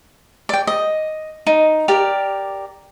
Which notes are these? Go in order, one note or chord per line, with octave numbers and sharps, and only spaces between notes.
D5 G5
D#5
D#4
G4 A#4 D5